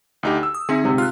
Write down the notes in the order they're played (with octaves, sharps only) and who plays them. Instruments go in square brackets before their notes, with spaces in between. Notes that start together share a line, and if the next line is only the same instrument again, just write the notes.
[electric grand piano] D2 D#4 G4
E6
[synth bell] D#6
[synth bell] D3 C4 D#4 [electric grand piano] G#4 E5
[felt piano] G#2 C3
[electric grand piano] F4 [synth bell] F6 F#6